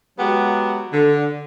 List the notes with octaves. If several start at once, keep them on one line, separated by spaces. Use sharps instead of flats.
F#3 G#3 B3 F#4 G4
D3